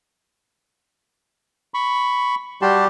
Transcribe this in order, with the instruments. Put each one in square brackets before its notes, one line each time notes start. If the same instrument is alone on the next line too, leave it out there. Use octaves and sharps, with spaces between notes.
[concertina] B5 C#6
[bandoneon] G3 G4 [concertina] F#4 A5 C6